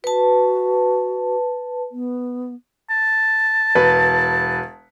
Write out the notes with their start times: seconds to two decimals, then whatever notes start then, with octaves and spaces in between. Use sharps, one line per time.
0.04 F#4 B4 A5
1.92 B3
2.90 A5
3.75 E1 B4